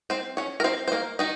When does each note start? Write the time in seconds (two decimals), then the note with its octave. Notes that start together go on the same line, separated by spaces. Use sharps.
0.10 C4 C5
0.37 C#4 C#5
0.60 A#4
0.64 C4 C5
0.88 C5
0.92 A#3 A#4
1.19 D#3 D#4